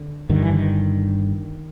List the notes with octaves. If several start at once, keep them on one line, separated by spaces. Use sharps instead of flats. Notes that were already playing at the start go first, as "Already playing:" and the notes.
Already playing: D3
G1 G2 D3 D#3
E3
D#3